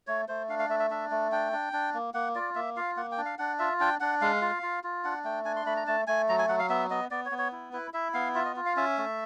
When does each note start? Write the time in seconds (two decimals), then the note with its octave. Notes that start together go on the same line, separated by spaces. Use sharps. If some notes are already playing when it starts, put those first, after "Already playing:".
0.07 A3 C#5
0.28 A3 C5
0.49 D4 F5
0.59 F5
0.69 A3 E5
0.80 E5
0.90 D4 E5
1.11 A3
1.32 D4 G5
1.53 D4
1.73 D4
1.94 A#3
2.14 A#3 F#5
2.35 F4 D5
2.55 A#3 E5
2.77 F4 F5
2.97 A#3 F#5
3.11 G5
3.18 D4
3.25 F5
3.38 D4 F#5
3.59 F4 E5
3.80 D4 G5
4.00 D4 F#5
4.21 G#3 F5
4.41 F4
4.63 F4
4.84 F4
5.04 D4 F#5
5.24 A3 G5
5.45 D4 G#5
5.56 C6
5.66 A3 B5
5.76 A#5
5.87 A3 A5
6.07 A3 G#5
6.29 F#3 A#5
6.39 G#5
6.49 F#3 F#5
6.59 F5
6.69 B3 E5
6.90 B3 D#5
7.11 B3 D5
7.25 C#5
7.31 B3
7.38 C#5
7.52 E4
7.73 E4 B4
7.94 E4 E5
8.14 B3 F5
8.35 F4 E5
8.45 D#5
8.56 F4
8.66 F5
8.76 C#4 E5
8.98 A3